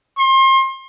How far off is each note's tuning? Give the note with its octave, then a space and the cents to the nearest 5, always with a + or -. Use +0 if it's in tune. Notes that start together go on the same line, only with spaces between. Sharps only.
C6 +35